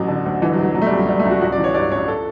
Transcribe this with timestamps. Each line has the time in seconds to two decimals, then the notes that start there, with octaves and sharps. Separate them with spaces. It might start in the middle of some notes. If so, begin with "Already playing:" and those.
Already playing: A1 F#3
0.08 D3
0.25 D2
0.42 D3 E3
0.53 F#3
0.58 D2
0.63 F#3
0.75 B2 F#3
0.82 A3
0.86 G3
0.92 C#2
0.97 F#3
1.08 B2 G3
1.20 A3
1.25 C#2
1.31 F#4
1.42 A1 F#4
1.52 D5
1.58 E3
1.64 C#5
1.74 G2 D5
1.91 A1 C#5
2.08 A4